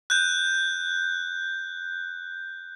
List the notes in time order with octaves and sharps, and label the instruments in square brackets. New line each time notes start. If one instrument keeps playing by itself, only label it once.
[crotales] F#6 G6